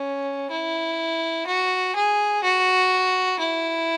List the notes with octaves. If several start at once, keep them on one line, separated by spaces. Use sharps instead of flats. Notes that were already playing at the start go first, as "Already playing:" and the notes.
Already playing: C#4
E4
F#4
G#4
F#4
E4